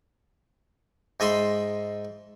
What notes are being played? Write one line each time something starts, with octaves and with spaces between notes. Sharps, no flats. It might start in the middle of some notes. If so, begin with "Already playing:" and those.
G#2 D#5 E5 B5 C6